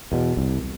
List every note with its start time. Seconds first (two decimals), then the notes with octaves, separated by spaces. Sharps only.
0.12 E2 B2
0.37 C2